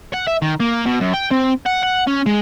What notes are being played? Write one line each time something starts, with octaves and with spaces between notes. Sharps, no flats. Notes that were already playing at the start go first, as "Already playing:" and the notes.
F#5
E5
D#3
A#3
B2
F#2
G5
C4
F#5
F#5
C#4
G#3